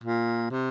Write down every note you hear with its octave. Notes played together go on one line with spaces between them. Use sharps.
A#2
C3